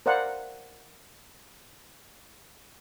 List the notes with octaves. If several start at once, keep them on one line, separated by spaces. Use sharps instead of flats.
A#4 C5 D5 F5 F#5